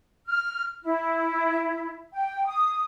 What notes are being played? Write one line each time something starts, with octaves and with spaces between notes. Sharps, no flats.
F6
E4
G5
D#6